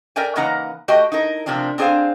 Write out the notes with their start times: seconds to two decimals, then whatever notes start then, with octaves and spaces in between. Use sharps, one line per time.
0.16 A#4 D5 E5 G5 G#5
0.36 C#3 E3 A#3 D#4 F#5 A#5
0.88 A3 F#4 G4 D#5 G5 A5
1.12 D#4 E4 A#4
1.46 C3 F3 A#3 C4 D4
1.78 C4 D4 G#4 B4 C5 F5